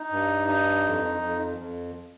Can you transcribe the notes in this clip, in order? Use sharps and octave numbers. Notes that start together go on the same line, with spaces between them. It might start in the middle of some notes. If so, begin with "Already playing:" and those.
Already playing: D#4
G2
D#4
F2
F2
F2